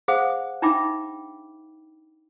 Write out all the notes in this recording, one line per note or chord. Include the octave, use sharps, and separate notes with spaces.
G#4 C5 F5 F#5 D#6
D4 D#4 E5 G5 B5 D6